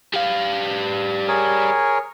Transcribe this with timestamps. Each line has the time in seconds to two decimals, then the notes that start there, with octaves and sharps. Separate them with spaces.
0.14 G3 F5
1.28 G#4 A#4 C#5